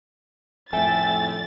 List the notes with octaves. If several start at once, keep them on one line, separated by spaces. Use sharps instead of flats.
F2 A2 A4 E5 G5 G#5 A6